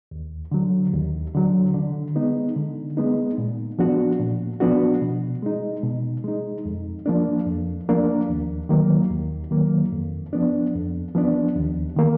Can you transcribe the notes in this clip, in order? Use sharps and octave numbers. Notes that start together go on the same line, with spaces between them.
D#2
D3 F#3
D#2
D3 F#3
D3
G#3 B3 D#4
D3
G#3 B3 D#4
A#2
F3 B3 D4 F#4
A#2
F3 B3 D4 F#4
B2
G#3 D#4
B2
G#3 D#4
F2
F3 A#3 D4
F2
F3 A#3 D4
D#2
D#3 F#3 A#3
D#2
D#3 F#3 A#3
F2
F3 B3 D4
F2
F3 B3 D4
D#2
D#3 A#3